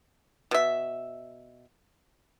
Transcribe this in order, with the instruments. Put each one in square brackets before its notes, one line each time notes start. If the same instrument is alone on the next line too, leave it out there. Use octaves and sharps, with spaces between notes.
[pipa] B2 E5